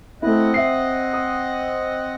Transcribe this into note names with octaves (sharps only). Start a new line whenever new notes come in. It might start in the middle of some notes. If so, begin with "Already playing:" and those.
A3 C4 E4 D#5 F#5
E5 C7
D#6